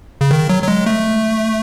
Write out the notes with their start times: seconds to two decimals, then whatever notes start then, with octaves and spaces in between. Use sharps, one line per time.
0.21 C#3
0.31 D#3
0.50 F#3
0.63 F#3
0.68 G#3
0.86 A3